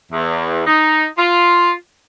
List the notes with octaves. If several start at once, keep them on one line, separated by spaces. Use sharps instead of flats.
E2
D#4
F4